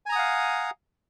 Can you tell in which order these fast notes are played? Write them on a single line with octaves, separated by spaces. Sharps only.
G#5 A#5 D#6 F#5 F5